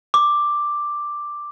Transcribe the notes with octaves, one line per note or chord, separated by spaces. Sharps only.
D6